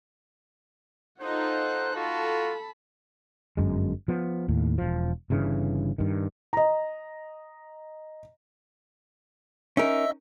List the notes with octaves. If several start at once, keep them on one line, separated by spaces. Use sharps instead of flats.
D#4 F4 A4 C5 F#5 F#6
F4 F#4 A4 A5 B5
G1 F#2 G#3
F3 B3
D#2 A2
E1 F3
G1 G2 C#3 E3
G2 D#3
D#5 A#5
C#4 D#4 A#4 D#5 E5 E6